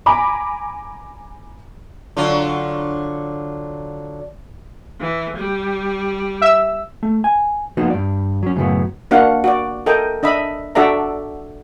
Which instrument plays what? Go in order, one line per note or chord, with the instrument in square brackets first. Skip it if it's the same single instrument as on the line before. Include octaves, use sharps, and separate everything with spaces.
[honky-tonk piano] G#5 A#5 B5 D6
[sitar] D3 F#3 F4
[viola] E3
G3
[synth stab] E5 E6
[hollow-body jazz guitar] A3
G#5
F3 A#3 B3 D#4 F#4
G2 D5
F#3 C#4
F#2 A2 C#3 E3 F#3 B3
[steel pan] A#3 D4 F#4 F5 F#5
F#4 D5
A4 A#4 D#5 G5
D4 D#5 E5 B5
D4 F#4 A4 D5 E5 A#5